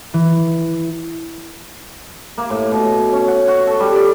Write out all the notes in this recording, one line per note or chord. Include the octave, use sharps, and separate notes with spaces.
E3
A#3
A2
B2
C#4
F#5
F#4
A4
G3
D5